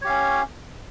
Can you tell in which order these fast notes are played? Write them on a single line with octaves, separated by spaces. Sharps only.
C#5 G4 F5 C#4